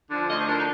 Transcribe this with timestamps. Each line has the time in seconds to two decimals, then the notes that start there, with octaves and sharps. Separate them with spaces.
0.09 D3 F3
0.28 D2 D#5
0.38 C5
0.47 D3 F3 A#4
0.57 D#4